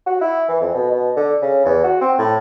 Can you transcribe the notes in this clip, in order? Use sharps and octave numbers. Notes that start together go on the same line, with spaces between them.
F#4
E4
E3
F2
B2
B2
D3
C#3
E2
F#4
C4
A2